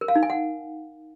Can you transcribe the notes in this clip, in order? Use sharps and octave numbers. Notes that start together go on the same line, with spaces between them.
A#4
F5
D#4
G#5
F#5